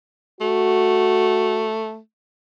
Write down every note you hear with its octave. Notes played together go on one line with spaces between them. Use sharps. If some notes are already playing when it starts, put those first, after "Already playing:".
A3 F#4